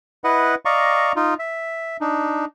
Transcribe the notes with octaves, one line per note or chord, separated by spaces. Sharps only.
E4 B4 D#5 F#5
D5 D#5 F5 A#5 C#6
D#4 F4
E5
D4 D#4